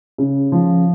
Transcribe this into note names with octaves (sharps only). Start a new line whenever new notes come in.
C#3
F3